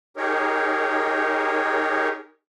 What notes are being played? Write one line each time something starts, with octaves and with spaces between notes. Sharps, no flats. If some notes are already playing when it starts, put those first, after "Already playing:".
D#4 G4 G#4 A#4 C#5